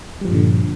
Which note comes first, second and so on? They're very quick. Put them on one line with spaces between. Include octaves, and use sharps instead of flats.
G3 F3 G2 A#2 D3